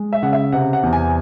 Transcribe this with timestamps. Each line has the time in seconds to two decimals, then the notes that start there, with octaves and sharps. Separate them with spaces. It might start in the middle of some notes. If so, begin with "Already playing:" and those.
Already playing: G#3
0.13 E5
0.23 C#3 F#5
0.33 E5
0.53 C3 F#5
0.73 F#5
0.83 E2
0.93 G#5